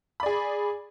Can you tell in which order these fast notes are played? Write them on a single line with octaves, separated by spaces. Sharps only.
B5 D5 G#4